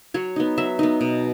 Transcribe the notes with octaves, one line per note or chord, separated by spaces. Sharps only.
F#3 C#5
B3 D#4
F#3 E5
B3 D#4
B2